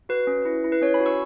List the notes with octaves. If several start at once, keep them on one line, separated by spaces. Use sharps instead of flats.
F#4 B4
C#4
E4
E4
B4
C#4 C#5
G#5 B5
F#4
C#6 E6